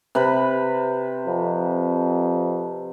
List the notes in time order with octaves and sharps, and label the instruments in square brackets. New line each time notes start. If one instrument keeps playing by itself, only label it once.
[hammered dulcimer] C3 B4 B5
[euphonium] F2